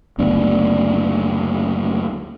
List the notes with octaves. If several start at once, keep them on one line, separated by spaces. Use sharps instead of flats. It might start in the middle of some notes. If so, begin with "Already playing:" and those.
F#1 D2 B3 D4